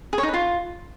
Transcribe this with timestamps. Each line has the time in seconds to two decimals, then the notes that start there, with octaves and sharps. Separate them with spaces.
0.13 G#4
0.18 C#5
0.23 D#4
0.28 B4
0.34 F4